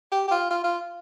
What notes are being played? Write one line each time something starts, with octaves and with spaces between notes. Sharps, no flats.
G4
G4
F4
F4
F4